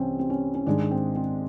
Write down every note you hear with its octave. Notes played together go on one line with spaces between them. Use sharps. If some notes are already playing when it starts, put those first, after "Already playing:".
Already playing: C2 C3 E3 C4 C#4
C4
C#4
C#4
G#2 D#3 G#3 D4
C4
C4